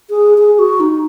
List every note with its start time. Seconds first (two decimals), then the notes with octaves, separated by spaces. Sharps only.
0.10 G#4
0.38 G#4
0.59 F#4
0.80 D#4